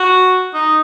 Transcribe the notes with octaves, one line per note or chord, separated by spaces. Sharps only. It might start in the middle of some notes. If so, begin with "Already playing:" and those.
Already playing: F#4
D#4